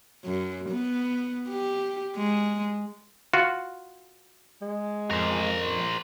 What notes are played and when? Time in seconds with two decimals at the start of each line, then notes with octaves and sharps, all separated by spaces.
0.25 F#2
0.70 B3
1.49 G4
2.17 G#3
3.34 F4 F#4
4.62 G#3
5.11 F2 A#4 C5